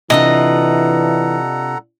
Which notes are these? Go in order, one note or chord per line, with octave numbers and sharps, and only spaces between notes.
C3 E3 D4 F4 A4 D#5 F#5 A#5